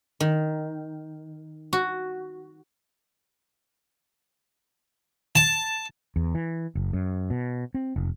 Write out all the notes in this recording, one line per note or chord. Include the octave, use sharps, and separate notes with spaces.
D#3
F#4
A5
E2
E3
F#1
F#2
B2
C4
F1